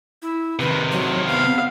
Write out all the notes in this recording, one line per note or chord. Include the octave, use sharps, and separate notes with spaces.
E4
C3 D#3 B4
F#3
B3 F5